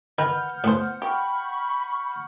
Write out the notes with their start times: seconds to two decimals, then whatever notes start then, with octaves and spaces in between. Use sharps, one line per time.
0.18 D#3 B4 F#5 F6 G6
0.64 A2 B3 C5
1.02 G4 B5 C#6